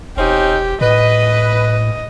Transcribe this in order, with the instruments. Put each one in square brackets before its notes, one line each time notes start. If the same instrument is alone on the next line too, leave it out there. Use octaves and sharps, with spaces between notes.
[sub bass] E1 [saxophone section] C4 C#4 D#4 [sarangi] G4
[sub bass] A2 [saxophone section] B4 [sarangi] D#5